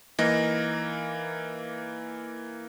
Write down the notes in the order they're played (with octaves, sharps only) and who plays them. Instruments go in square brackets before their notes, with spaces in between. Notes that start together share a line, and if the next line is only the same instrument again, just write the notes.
[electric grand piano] E3 A#3 [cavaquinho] D#4